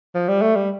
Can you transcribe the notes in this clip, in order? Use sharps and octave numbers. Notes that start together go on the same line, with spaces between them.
F3
G3
A3
G3